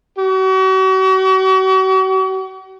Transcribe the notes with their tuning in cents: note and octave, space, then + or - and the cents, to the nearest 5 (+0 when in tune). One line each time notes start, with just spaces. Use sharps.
F#4 +40